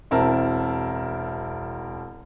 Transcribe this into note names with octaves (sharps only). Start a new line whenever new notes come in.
E1 C4 E4 A#4 A5